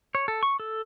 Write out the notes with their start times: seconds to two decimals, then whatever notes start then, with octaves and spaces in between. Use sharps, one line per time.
0.15 C#5
0.28 A4
0.43 C#6
0.60 A4